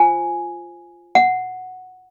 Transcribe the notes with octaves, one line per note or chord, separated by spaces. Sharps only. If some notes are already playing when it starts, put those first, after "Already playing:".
Already playing: F4 C5 G#5
F#5